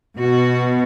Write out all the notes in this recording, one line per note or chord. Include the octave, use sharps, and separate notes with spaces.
B2 F#4